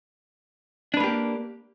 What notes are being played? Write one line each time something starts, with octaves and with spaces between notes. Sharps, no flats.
A#3 D4 G4 B4